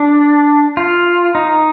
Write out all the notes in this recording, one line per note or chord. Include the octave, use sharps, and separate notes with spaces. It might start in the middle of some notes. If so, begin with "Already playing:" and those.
Already playing: D4
F4
D#4